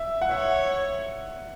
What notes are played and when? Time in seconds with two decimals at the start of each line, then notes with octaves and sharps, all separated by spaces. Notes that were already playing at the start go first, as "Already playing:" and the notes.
Already playing: E5
0.22 F#5
0.31 C#5 E5